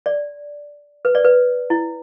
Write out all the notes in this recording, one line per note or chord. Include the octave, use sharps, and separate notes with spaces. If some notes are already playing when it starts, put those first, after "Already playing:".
D5
B4
D5
B4
E4